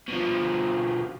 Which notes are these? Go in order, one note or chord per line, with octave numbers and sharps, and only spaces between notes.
B2 F3